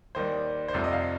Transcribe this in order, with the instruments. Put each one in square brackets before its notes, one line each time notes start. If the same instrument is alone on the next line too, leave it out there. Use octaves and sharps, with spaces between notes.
[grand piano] D#2 D#3 G3 C5
C5
F1 F2 C3 G3 D5
D#5
F5